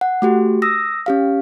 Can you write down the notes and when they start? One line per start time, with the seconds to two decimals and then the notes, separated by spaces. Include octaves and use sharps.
0.01 F#5
0.22 A3 F#4 G4
0.62 D#6 E6 A#6
1.06 C#4 G4 F5